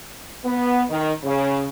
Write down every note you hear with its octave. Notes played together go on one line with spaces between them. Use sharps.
B3
D#3
C#3